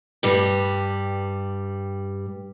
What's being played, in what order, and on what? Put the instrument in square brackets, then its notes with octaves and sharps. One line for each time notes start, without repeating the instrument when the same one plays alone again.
[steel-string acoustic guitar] G2 G3